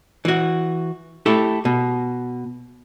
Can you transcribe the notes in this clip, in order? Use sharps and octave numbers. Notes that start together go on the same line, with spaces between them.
E3 F#4
A3 E4 G4
B2